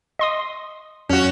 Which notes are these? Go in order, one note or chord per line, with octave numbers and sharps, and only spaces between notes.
D#5 C6 D#6
F#2 C#4 F#4